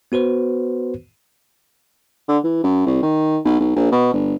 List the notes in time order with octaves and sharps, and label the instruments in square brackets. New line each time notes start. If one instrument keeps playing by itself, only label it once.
[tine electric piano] B3 F#4 B4 C5
[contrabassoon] D3
E3
F#2
C2
D#3
B1
B1
A#1
B2
G1